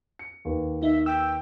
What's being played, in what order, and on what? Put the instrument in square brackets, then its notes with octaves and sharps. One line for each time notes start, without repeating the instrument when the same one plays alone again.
[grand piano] C#7
D#2 B4
[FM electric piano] D#4 [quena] E5
[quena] G5 [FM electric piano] E6